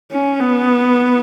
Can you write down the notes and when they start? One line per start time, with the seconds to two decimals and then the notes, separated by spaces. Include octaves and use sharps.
0.12 C#4
0.40 B3